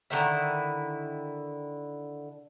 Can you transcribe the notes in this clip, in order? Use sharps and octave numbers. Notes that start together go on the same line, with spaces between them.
D3 D#3 E4